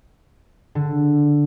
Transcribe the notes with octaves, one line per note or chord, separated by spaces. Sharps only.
D3